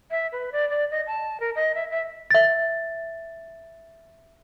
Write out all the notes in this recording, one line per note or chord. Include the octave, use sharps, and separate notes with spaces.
E5
B4
D5
D5
D#5
A5
A#4
D#5
E5
E5
E5 A6